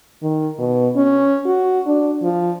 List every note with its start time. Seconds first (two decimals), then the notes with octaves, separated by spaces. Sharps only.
0.22 D#3
0.59 B2
0.96 C#4
1.46 F#4
1.87 D4
2.23 F3